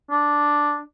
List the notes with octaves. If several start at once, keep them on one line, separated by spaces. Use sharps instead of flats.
D4